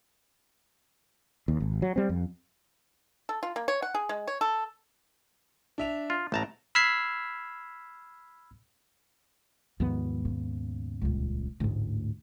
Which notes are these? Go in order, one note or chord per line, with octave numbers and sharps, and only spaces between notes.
D#2
G#1
F#3
G3 C4
F2
A4
F4
A#3
C#5
F#5
G#4
G#3
C#5
A4
D4 E5 F7
F4
A1 A2 A5 A#5
B5 E6 F6 G#6 B6 C7
D#2 G#2 F3 B3
C#3
D#1 C#2
A1 D2 G#2